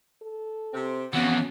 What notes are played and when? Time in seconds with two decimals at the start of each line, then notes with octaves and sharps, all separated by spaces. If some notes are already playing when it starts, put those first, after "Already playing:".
0.22 A4
0.74 C3 C4
1.13 F2 E3 B3 C#4 F#4